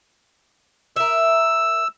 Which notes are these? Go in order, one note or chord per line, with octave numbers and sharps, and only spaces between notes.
A#4 E5 E6